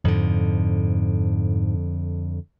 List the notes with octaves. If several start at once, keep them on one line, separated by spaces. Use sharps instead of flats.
F2 G#2 D3